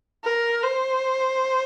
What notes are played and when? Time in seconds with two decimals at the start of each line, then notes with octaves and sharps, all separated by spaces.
0.24 A#4
0.64 C5